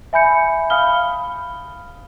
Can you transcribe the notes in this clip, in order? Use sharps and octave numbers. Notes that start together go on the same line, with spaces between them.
E5 G#5 B5 G6 C#7
F5 B5 D#6 F6 G7